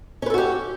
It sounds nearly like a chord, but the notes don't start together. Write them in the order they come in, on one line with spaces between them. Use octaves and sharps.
C#4 B4 A4 F#4 G4